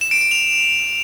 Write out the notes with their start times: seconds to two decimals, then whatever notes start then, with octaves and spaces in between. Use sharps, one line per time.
0.01 E7
0.11 D7
0.21 D7
0.31 F7